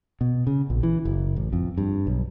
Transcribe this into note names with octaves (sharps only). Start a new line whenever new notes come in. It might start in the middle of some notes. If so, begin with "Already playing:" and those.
B2
C#3
A#1
E3
F#1
A1
F2
G2
B1